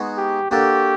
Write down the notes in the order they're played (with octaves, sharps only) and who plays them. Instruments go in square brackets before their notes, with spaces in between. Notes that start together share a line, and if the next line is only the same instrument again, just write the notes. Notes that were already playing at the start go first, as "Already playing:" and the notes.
Already playing: [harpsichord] G#3 B3 D#4 F#4
[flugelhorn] G4
[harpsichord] A#3 D4 F#4 A4 [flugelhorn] G4